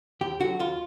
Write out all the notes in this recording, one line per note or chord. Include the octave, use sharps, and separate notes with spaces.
D#2 G4
D3 F#3 F#4
D#2 F4